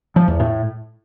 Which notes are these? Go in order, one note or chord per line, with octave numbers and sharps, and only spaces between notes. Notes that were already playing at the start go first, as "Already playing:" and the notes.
F3
E2
A2